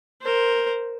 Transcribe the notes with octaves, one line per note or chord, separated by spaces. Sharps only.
A#4 C5